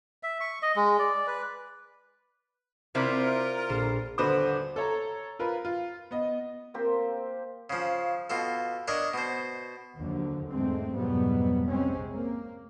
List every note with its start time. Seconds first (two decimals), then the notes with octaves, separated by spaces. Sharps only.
0.23 E5
0.41 C#6
0.62 D#5
0.76 G#3
0.99 D5
1.27 B4
2.95 C3 C4 E4 F4 A#4 C5 D5
3.70 A#1 A4 C5 A6
4.18 D#1 D3 F#4 B4 C5 D6
4.76 A4 C#5 A#5
5.39 F4 A#4 B4
5.65 F4
6.11 B3 D#5
6.74 A#3 C4 G4 C5
7.70 C#3 F3
8.30 B2 F4 A4
8.88 D4 A#4 C#5 D#5
9.14 B2 C5
9.96 D#2 D3 F3 F#3
10.49 E2 G#2 G#3 A3 C4
10.93 F2 G#2 B2 F#3 G3 B3
11.67 C3 G#3 C4 C#4
12.11 A#3